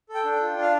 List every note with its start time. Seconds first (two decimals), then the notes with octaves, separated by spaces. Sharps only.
0.09 A4
0.14 G5
0.25 D4
0.36 G5
0.41 F4
0.56 D4
0.62 F5